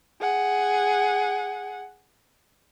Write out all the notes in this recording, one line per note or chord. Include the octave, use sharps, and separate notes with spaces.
G#4 F#5